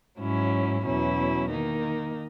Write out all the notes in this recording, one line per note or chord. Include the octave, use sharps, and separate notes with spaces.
G#2 F#3 C#4 E4
E2 B2 F#3 C#4 E4
D#3 A#3 D#4